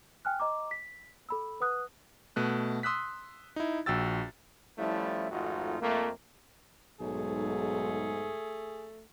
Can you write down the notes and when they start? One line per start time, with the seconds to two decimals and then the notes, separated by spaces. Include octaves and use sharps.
0.25 G5 G#5 F6 F#6
0.40 D#5 A#5 D6
0.71 B6
1.29 A4 B5 E6
1.60 B4 F#5 D#6 F#6
2.36 B2 A3 F#6
2.83 C6 D#6 E6 F#6 B6
3.56 D#4 E4
3.86 A#1 F#4 G5 E6 A6
4.78 F3 G3 A3 C#4 E4
5.31 G#1 F2 A3 D#4 F4 F#4
5.81 F2 A3 A#3
7.00 B1 G#2 A3 G#4